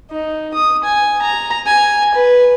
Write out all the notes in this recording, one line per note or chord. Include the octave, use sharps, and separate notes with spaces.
D#4
D#6
G#5
A#5
G#5
B4